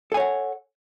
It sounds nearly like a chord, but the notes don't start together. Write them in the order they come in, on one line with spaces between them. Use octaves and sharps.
A4 G#5 C#5 F#5